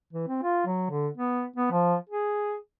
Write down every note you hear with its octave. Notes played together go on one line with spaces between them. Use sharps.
E3
C4
F4
F#3
D3
B3
B3
F3
G#4